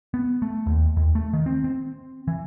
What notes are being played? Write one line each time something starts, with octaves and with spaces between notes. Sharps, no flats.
B3
A3
D#2
D#2
A3
D#3
C4
C4
E3